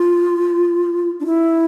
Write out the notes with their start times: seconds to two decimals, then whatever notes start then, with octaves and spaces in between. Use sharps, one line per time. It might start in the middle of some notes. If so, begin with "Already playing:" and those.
Already playing: F4
1.20 D4
1.26 E4